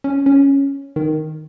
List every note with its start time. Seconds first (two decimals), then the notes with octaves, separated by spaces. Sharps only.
0.04 C#4
0.26 C#4
0.96 D#3